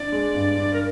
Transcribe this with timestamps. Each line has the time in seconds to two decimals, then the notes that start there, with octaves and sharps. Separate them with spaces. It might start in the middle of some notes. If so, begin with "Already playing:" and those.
Already playing: D4 D5
0.12 G#3
0.34 G2
0.57 D4
0.73 A#4